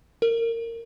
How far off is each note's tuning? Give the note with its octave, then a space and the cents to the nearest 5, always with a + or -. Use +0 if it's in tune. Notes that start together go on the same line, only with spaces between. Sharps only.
A#4 -20